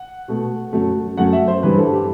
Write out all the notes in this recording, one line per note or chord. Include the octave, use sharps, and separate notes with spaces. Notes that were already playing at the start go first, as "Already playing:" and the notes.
Already playing: F#5
B2 A3
F#2 F#3 A3
F#2 F#3 A3 F#5
E5
C5
G2 E3 G3 B4
A4
G4